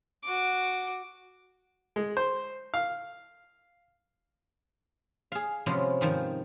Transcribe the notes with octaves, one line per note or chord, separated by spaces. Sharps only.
F#4 D6
G#3
C5
F5
G#4 F5
C3 F3 G#3 B3 C#4
G#2 D#3 F3